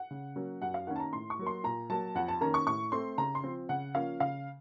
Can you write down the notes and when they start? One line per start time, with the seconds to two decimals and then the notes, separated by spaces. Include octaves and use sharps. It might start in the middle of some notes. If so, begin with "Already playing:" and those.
Already playing: F#5
0.11 C#3
0.36 F#3 A#3 C#4
0.62 F#2 F#5
0.74 F5
0.87 D#3 A#3 C#4 F#5
0.96 A5
1.00 A#5
1.13 A2 C6
1.30 C#6
1.39 F#3 A#3
1.46 C6
1.64 A#2 A#5
1.90 F#3 A#3 A5
2.15 F2 F#5
2.28 A5
2.41 D#3 A#3 C#4 A#5
2.54 C#6
2.66 A2 C#6
2.92 A3 C4 C6
3.18 C#3 A#5
3.35 C6
3.44 F3 C4
3.69 C#3 F#5
3.95 F3 A#3 C#4 F5
4.20 C#3 F5